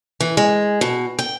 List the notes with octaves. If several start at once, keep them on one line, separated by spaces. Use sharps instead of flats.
E3
G#3
B2
G5